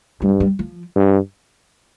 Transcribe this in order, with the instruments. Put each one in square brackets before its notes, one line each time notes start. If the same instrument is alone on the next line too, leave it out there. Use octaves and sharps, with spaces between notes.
[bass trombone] G2 [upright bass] G3
[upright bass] G3
F3
[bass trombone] G2